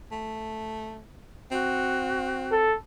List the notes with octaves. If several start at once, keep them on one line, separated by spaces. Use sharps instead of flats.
A3
C4 F#4
A4